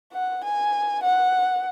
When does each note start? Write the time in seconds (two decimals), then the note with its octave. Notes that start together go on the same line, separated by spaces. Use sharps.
0.13 F#5
0.44 G#5
1.03 F#5